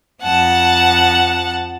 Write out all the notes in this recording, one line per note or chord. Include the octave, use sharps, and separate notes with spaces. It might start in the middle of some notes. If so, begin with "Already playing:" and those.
F2 F#5 A5